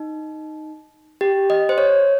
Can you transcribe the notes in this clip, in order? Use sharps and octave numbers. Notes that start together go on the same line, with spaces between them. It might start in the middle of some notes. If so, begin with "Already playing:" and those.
Already playing: D#4
G4
D#5
C5
C#5